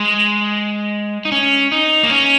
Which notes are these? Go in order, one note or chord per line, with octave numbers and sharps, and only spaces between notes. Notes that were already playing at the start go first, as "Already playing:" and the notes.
Already playing: G#3
D#4
C#4
D#4
A#3
C#4